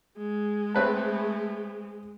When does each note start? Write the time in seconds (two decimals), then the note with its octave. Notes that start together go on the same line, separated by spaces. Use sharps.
0.18 G#3
0.75 A3 C4 B4 A5